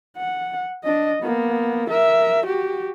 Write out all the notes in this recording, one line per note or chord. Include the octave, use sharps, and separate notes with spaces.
F#5
D4 D#5
A#3 B3
A#4 E5
F#4 G4